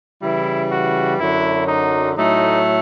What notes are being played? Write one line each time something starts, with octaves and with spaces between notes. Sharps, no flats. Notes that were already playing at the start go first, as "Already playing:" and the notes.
C#3 E3 G3 E4
F#4
F#2 D3 F#3 E4
D#4
A2 F#3 A3 D#4